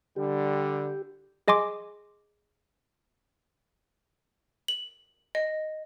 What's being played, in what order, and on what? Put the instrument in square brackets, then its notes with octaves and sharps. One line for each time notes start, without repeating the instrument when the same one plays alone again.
[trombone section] D3 G3 [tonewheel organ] G4
[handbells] G#4 D#5 G#5 C6 D6
[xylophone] F#7
D#5